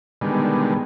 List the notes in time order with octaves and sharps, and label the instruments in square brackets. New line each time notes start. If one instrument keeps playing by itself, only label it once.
[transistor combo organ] B2 D3 D#3 G3 G#3